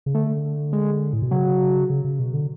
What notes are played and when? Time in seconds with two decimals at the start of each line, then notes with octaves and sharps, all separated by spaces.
0.06 C#3
0.14 D3 A3
0.73 G#3
1.13 A2
1.22 B2
1.31 C#3 F#3
1.90 C#3
2.05 C#3
2.19 B2
2.34 D3